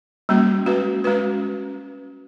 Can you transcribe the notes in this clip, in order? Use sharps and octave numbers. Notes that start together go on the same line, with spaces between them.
G3 A#3 C#4 F#4
G#3 C#4 F#4 B4
G#3 C#4 F#4 B4